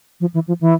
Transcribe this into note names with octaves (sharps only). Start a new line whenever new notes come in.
F3
E3
F3
E3